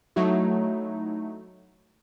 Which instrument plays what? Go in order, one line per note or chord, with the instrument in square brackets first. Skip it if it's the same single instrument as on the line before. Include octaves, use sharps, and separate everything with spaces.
[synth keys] F#3 A3 D#4 E4 F#4